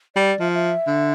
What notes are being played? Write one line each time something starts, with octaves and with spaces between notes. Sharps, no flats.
G3 D5
F3 E5
E5
D3